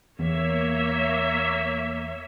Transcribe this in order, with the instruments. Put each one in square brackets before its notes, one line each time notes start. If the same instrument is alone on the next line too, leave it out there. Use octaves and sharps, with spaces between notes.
[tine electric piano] E2 [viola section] A#3 C#5 E5